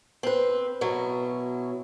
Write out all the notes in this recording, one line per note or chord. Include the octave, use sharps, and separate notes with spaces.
C4 B4
B2 F#3 E4